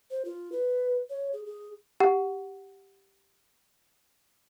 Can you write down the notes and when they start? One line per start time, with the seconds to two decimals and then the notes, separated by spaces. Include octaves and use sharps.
0.11 C5
0.25 F4
0.52 B4
1.10 C#5
1.33 G#4
1.46 G#4
2.00 G4 F#5